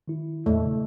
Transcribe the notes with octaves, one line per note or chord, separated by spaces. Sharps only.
D#3 E4
E2 A#2 A3
C#3